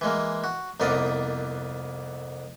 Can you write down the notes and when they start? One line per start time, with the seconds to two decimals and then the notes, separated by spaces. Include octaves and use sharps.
0.01 E3 G#3 A#3
0.44 F#4
0.80 C2 F2 A#3 B3 D5 D#5